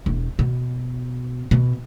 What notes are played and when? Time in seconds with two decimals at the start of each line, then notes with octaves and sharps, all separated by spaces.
0.06 E1
0.39 B2
1.51 B2